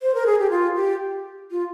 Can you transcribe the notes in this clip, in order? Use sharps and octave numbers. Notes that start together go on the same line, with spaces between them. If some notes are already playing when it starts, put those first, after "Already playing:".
C5
A#4
G#4
G4
F4
G4
F4